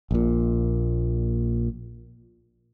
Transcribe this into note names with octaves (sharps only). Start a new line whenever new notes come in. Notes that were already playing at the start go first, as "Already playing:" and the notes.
A#1 A#2